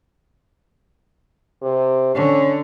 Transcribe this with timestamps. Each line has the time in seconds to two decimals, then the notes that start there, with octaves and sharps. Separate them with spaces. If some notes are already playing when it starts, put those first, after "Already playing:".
1.62 C3
2.16 D3 C#4